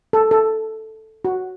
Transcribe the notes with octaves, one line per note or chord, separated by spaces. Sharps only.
A4
A4
F#4